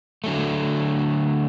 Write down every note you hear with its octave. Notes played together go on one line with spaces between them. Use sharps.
D3 F#3 A3